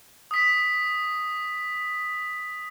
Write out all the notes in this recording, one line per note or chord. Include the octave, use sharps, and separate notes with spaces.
D#6 B6